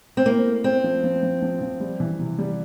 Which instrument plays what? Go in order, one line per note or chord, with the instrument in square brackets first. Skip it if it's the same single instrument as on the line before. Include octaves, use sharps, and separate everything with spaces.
[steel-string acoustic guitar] C4
[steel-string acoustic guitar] A#3 [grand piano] E4
[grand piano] A3
[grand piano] A3 [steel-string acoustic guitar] C4
[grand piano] F3
F3
F3
F3
F3
G3
E3
C3
G3